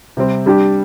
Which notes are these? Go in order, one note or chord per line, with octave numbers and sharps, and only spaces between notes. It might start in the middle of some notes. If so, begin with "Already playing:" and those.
C3 G3 C4
G3 D4 G4